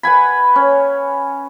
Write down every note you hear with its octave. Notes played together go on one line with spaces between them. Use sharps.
B4 F#5 G#5 B5
C#4